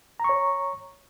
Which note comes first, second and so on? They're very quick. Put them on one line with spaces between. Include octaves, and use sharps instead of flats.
A#5 C#6 C#5